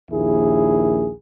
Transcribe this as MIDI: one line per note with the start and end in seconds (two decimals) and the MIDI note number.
0.11 1.11 34
0.11 1.11 39
0.11 1.11 64
0.11 1.11 68